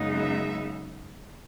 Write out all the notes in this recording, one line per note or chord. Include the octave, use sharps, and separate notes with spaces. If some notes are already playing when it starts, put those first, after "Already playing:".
Already playing: F#2 C#3 G#3 B3 D#4
E5